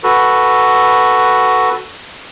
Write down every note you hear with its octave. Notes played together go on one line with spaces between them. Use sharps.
F#4 A4 B4